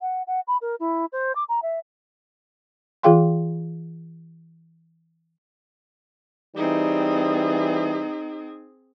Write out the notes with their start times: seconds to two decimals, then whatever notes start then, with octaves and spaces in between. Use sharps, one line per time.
0.01 F#5
0.27 F#5
0.48 B5
0.61 A#4
0.80 E4
1.12 C5
1.36 D6
1.49 A#5
1.63 E5
3.03 E3 F4 G#4 F5 G5 C6
6.56 E3 G3 C4 D#4 G#4